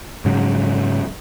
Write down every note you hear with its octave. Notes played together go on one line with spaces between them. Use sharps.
G#2 C#3 F#3